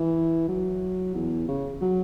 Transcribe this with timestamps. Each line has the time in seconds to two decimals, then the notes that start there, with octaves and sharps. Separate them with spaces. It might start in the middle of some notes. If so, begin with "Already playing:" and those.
Already playing: E3
0.48 F#3
1.15 E2
1.48 C#3
1.81 F#3